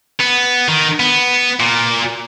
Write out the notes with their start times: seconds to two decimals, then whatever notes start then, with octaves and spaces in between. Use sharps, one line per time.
0.20 B3
0.68 D#3
1.00 B3
1.60 A#2